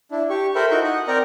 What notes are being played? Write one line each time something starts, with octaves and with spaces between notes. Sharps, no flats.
D4 E4
G4 C#6
A4 A#4 C5 E5 G5 B5
D#4 E4 F#4 C#6 G6
D#5 F#5
C4 A#4 D5 G5 A#5